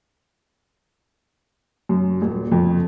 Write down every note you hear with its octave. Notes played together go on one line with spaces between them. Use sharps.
F#2
D#1
F2